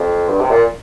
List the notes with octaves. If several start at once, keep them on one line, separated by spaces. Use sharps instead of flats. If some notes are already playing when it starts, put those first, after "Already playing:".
Already playing: F2
G2
C3
A#2